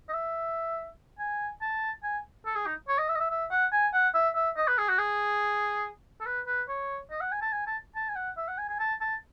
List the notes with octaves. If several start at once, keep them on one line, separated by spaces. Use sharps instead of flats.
D#5
E5
G#5
A5
G#5
A4
G#4
D#4
C#5
D#5
E5
D#5
E5
E5
F#5
G#5
F#5
E5
E5
D#5
B4
G#4
F#4
G#4
A4
B4
B4
C#5
D#5
F#5
G#5
A5
G#5
A5
A5
G#5
F#5
E5
F#5
G#5
G#5
A5
A5